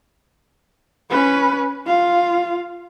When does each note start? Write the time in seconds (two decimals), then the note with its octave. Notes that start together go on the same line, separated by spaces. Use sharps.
1.10 C#4 B4
1.86 F4 F5